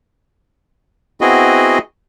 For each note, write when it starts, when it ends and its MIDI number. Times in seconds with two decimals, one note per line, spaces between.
1.21 1.78 59
1.21 1.78 60
1.21 1.78 64
1.21 1.78 66
1.21 1.78 68
1.21 1.78 75